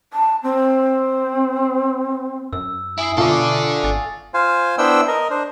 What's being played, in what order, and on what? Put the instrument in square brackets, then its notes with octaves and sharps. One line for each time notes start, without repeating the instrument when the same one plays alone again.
[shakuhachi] A5
C4
[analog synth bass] F#2 [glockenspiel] E6
[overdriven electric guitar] E4 [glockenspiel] G#5 D#6 C7
[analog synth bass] B2 [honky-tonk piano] F4 E5 D6 [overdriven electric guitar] A4 D5 [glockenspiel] C#6
[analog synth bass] G#1 [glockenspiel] G#5 A6
[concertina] F4 C5 F5 G#5
B3 D4 E4 C5 G5 E6
A#4 D#5
D4 C5